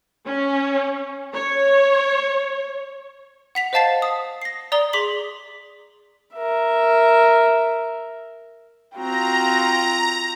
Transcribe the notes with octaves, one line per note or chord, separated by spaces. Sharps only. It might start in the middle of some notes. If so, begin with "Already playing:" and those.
C#4
C#5
F#5 B6 F7
C5 D#5 F5 A5 A6 C7
D#6
A#6 C7
D5 A#5 D#6 G7
G#4 C6 D6 B6 F#7
A#4 E5
C4 F4 F#4 G5 A#5